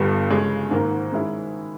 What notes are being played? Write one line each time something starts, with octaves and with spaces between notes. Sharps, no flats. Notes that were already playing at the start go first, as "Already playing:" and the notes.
Already playing: G1 G2 G3 B3 G4
C#3 G#3 C#4
G#2 D#3 A#3
D#3 G#3 C#4 E4